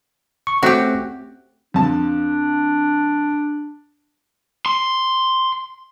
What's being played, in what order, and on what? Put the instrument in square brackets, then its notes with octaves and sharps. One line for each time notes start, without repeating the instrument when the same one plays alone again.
[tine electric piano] C#6
[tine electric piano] A3 C4 C#4 [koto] F#4 G4
[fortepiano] F2 A5 [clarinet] D4
[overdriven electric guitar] C6